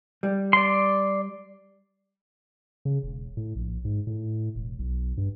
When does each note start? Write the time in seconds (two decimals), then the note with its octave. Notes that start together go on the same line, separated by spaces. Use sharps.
0.23 G3
0.53 D5 C6
2.85 C#3
3.03 E1
3.37 A2
3.55 A#1
3.85 G#2
4.07 A2
4.55 E1
4.79 B1
5.17 G2